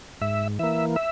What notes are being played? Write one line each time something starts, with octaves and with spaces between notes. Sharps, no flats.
G#2 E5
E3 A#3 E5
E5